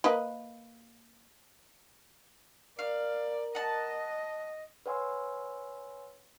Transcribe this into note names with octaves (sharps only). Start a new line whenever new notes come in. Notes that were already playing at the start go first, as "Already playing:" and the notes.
A#3 B4 D#5
A#4 D5 F5
D#5 F#5 A5
B4 C#5 F#5 G#5 C6 E6